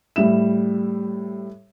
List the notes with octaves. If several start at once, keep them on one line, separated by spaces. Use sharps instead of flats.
A2 G3 E5 E7